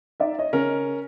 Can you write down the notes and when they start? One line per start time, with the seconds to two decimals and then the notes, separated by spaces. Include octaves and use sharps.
0.20 D#4 D5 E5
0.38 C#5 D#5
0.53 C#3 C#4 A#4